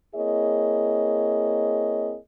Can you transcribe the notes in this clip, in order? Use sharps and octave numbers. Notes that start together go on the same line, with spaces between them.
A#3 C4 E4 G#4 C#5 D#5